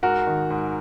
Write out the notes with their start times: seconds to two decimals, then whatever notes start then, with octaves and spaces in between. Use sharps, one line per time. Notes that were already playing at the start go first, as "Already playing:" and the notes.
0.03 G#2 F#4 A#4
0.27 D#3
0.50 G#2